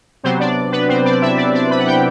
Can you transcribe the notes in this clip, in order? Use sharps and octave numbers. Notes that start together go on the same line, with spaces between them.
C3 F#3 B3 C4 C5
D4 D5
B3 B4
C4 C5
D4 D5
E4 E5
D4 D5
D4 D5
B4 B5
F#5
G4 G5